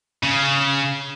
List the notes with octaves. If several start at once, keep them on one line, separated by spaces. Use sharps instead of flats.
C#3